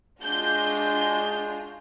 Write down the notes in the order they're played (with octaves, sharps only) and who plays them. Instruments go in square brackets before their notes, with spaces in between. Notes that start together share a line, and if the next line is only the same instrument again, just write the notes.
[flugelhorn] G#3 [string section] D4 F4 F#4 [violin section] G6